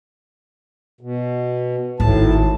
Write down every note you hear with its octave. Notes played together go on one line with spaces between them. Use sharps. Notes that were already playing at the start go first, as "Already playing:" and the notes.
B2
G#1 A2 A5